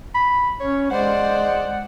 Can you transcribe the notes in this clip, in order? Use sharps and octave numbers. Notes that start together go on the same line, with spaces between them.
B5
C#4 C#5
G#3 C5 D5 F#5